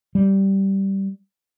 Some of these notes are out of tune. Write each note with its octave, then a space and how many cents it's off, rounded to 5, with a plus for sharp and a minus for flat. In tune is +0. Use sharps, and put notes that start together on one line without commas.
G3 -10